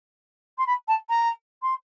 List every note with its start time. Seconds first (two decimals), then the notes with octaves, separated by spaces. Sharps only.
0.58 C6
0.66 B5
0.88 A5
1.09 A#5
1.62 C6